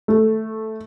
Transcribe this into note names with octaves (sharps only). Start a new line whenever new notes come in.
A3